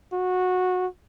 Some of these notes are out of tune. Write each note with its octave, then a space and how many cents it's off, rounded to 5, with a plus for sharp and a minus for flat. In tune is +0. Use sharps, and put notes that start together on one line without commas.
F#4 -15